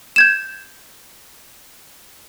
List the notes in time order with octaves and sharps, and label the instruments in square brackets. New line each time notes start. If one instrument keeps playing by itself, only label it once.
[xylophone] G6 G#6 E7